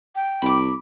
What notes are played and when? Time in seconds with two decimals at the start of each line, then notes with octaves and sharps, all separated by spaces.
0.16 G5
0.42 C2 B5 D6